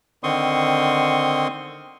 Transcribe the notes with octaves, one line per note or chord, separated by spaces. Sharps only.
D3 D#3 C4 C6 C#6 D#6